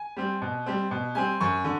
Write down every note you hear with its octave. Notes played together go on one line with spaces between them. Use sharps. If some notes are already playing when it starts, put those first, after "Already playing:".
Already playing: G#5
G3 C4
B2
G3 C4
B2
G3 C4 G#5
F#2 C#6
D3